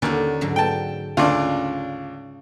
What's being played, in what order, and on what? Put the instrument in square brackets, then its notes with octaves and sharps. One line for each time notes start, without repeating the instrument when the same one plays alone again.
[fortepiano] D#2 [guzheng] D3 C#4 F#4
[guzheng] G#2 D3 F#3
[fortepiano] G5 A5
[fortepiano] D2 D4 D5 [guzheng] C#3 [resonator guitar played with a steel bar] F4